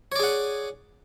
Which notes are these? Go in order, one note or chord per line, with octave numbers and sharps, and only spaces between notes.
G#4 C#5 D5 F#5